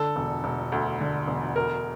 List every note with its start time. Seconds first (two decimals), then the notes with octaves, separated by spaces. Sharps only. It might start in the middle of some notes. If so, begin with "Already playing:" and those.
Already playing: D3 A4
0.16 E1
0.44 E1
0.72 D2
1.00 D3
1.28 E1
1.56 D2 A#4